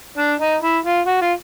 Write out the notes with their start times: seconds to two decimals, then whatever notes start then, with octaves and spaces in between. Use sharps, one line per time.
0.18 D4
0.40 D#4
0.63 E4
0.85 F4
1.06 F#4
1.22 F4